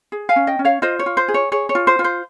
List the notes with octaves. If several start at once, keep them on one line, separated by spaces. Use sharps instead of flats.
G#4
F5 G#5
C#4
D#5 G5
C#4
C#5 F5
F4 C5 D#5
C#5
F4
C5
G#4
C#5
G#4 C#5
C#5
F4
C5
F4
C5